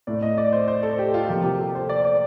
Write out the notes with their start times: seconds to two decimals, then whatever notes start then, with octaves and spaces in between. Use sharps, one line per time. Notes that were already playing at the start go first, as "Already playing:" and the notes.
0.07 A2 A3 D5
0.22 D#5
0.38 D5
0.52 C5
0.68 C5
0.83 A4
0.99 G4
1.14 F4
1.29 C3 F3 A#3 G4
1.45 G4
1.59 A4
1.75 C5
1.89 D5
2.05 D5